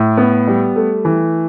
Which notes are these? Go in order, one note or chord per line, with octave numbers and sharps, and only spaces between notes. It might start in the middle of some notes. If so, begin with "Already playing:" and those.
Already playing: A2
B3
G3
A3
E3